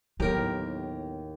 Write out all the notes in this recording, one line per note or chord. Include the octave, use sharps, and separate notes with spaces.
D#2 A2 F#3 B3 G4 A#4